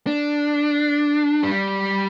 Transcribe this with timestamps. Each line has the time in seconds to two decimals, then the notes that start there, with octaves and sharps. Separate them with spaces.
0.07 D4
1.43 G3